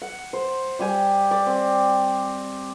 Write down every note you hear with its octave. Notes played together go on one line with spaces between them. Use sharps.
F#5
C5
G3 G4 G#5
D5
C4